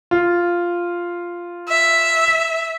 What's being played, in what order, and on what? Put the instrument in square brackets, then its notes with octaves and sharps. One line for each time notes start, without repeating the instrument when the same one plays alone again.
[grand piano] F4
[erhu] E5